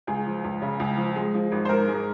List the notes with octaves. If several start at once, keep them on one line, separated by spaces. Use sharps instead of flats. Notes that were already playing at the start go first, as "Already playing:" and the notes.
C#2 G#4
F3
C#2
C#3
C#2
F3
G#3
F3
G#1
C5
G#2 A#4
G#3